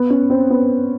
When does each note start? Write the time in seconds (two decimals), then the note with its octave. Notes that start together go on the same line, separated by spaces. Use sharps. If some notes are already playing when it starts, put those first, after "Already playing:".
Already playing: B3
0.10 C#4
0.30 C4
0.50 B3